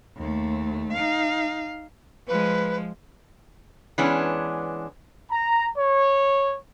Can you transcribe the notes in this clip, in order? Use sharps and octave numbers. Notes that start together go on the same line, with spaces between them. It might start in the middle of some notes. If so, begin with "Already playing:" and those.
D#2 A3
D#4 F5
F3 G#3 B4
E3 G#3 B3 C#4 D4
A#5
C#5